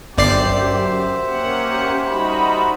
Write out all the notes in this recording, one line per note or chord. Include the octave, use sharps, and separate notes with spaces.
G1 F#2 G4 C5 D5 E5 C7
A#3 C#4 G4 F#5
G3 D#4 F#4 B5